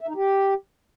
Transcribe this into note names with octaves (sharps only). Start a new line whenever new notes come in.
E5
D#4
G4